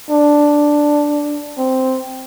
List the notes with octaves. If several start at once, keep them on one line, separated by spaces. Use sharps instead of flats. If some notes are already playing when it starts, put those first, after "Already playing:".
D4
C4